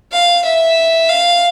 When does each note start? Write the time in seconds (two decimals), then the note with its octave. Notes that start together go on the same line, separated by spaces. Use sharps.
0.12 F5
0.45 E5
1.09 F5